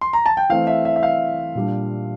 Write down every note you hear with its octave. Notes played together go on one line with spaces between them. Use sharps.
C6
A#5
A5
G5
E3 A3 C4 F5
E5
E5
E5
F5
A#2 G3 D4